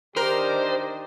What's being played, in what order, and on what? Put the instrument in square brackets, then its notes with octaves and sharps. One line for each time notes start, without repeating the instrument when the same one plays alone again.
[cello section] D#3 D4 D#5 [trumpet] G4 [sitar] A#4 [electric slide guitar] C5